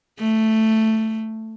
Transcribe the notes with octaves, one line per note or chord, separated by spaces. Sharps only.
A3